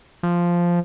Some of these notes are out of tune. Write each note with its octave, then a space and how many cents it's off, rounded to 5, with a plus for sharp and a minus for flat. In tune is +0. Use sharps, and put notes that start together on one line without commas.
F3 -5